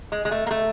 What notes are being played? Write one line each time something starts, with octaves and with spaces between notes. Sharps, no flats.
G#3
G#3
A3
A#3
A3